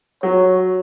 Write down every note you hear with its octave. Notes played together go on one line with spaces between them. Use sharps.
F#3 C#5